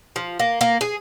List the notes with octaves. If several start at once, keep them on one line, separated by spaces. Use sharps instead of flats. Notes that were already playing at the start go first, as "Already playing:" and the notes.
F3
A#3
A#3
G#4